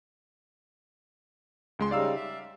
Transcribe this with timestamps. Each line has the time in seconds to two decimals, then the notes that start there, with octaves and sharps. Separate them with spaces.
1.79 C#2 G#3 C6
1.91 C#3 G3 D#4 D5 F5 E6
2.14 E5